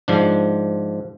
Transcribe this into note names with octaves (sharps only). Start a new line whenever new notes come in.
G#2 F3 D4